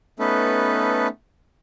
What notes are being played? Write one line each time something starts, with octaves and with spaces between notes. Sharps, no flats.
A3 B3 C#4 D#4 A4 B4